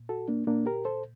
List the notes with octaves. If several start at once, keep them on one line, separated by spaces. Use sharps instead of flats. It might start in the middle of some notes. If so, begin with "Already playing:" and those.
Already playing: A#2
F#4 A4
A#3 D4
A#2 A#3 D4
G4 A#4
A4 C5